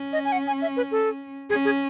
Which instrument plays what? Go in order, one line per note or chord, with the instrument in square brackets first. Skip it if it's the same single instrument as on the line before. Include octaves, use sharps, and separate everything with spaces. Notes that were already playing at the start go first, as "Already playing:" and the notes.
Already playing: [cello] C#4
[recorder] D#5
G#5
F#5
G#5
E5
B4
A4
[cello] C#4 [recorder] G#4
[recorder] G#4